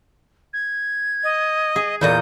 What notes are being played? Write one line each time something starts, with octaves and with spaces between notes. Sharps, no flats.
G#6
D#5
G#4
E2 A#2 D#5 G6